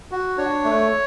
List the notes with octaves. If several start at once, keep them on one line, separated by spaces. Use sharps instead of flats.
F#4
D4 C#5
A3